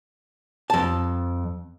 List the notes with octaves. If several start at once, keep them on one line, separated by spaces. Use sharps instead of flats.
F2 A5